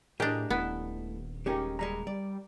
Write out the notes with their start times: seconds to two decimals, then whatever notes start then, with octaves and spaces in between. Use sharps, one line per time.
0.20 A2 D4 G4 G#4 A#4 D5 D#5
0.50 D#1 A3 B3 E4
1.46 G#3 C#4 D#4 G4 A#4
1.79 D2 G3 G#3 A#5
2.07 G3 D5